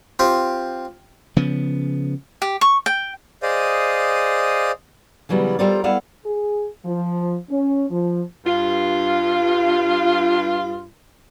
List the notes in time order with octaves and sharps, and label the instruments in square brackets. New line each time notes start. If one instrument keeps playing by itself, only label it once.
[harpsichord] C4 F4 G4
[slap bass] C#3 F3 B3
[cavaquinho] G4
C#6
G5
[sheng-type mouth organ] G#4 C5 D5 D#5 F5 D#6
[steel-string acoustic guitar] C#3 E3 F#3 G3 B3
G3 F4 A4 A#4 C5 D5
G3 B3 E4 A4 D5 F5
[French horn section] G#4
F3
C#4
F3
[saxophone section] G2 F4